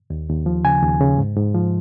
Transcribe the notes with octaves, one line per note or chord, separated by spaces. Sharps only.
D#2
D#2
F3
C#3 G#5
D#2
C#3
G#2
G#2
F3